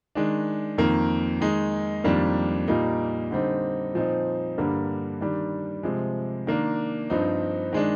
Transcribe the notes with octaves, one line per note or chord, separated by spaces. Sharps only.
D#3 G#3 D4
F2 D#3 A#3
D#3 G#3 D#4
F2 D#3 G3 A#3 D4
A#2 G3 A#3 D#4
D3 G3 C4 D#4
A#2 F3 C4 D#4
G2 D3 G3 A#3
D#3 G3 D4
C3 F3 G#3
D#3 A#3 D4
G2 F3 C4 D#4
D#3 G#3 D4